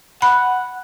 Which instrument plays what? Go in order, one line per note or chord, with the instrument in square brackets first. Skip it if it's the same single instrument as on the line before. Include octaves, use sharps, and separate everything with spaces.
[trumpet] F#5 [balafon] B5